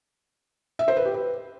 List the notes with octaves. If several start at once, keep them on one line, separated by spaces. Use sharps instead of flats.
E5
C5
B4
G4
B4